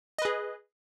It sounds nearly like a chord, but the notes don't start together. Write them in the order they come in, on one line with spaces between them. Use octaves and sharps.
D#5 B4 G#4